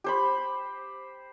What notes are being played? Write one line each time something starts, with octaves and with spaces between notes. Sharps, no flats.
G4 C5 B5